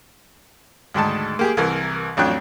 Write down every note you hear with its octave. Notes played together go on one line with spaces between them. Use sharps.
D2 G#2 D#3 A5
A#3 G4 G#4
C2 E3 A#4
A1 F2 F#3 D4 G5 F#6